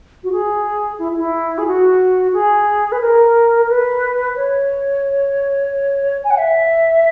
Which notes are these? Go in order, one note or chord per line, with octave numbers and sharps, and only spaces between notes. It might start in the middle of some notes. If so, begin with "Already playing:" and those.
F#4
G#4
E4
E4
G#4
F#4
G#4
B4
A#4
B4
C#5
G#5
F#5
E5